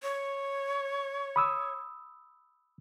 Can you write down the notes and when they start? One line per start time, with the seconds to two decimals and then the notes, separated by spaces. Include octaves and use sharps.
0.03 C#5
1.36 B5 D#6 E6